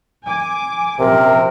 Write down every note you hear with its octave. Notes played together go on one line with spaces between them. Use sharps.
G#5 D6
A#1 F#2 C3 A#4